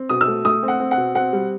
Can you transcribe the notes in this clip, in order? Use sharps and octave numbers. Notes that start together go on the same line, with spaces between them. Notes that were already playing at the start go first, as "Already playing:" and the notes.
Already playing: C4
B2 D#6
E6
A3
A3 D#6
C4
F#5
C4
F#5
B2
C4 F#5
G3